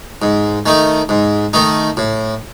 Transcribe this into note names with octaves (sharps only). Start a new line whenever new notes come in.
G#2
D#3 A3 D#4
G#2
D#3 A3 D#4
A2